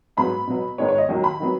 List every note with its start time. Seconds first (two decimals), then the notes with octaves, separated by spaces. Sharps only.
0.17 G#2 F#3 B3 B5
0.47 B2 F#3 B3
0.78 G#2 D#3 G#3 B3 C#5
0.88 C#5
0.98 D#5
1.09 D#2 D#3 F#3
1.24 B5
1.40 D#3 F#3 B3